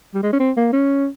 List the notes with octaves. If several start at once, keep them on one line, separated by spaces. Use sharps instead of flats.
G3
G#3
C#4
C4
A#3
C#4